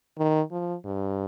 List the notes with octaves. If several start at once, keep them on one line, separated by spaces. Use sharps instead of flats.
D#3
F3
G2